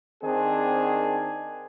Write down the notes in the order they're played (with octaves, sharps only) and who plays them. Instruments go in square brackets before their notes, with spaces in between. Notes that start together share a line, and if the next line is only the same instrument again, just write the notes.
[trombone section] D#3 C4 D4 G#4